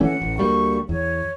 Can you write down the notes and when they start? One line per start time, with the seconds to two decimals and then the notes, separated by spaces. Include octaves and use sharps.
0.01 E3 A3 C#4 F#5
0.22 A1
0.38 D2 G3 A#3 C#6
0.89 E2 C#5